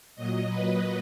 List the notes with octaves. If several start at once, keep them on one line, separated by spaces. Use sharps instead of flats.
A#2 F#3 D#5
B4